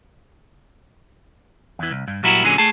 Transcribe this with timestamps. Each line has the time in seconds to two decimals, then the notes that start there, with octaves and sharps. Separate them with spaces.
1.79 E2 E3
1.91 C2
2.08 G2
2.23 A#2 F#3 G3 E4 F#4 A#4
2.44 A#2 D3 F#3 G#3 C#4
2.58 A3 G#4 A5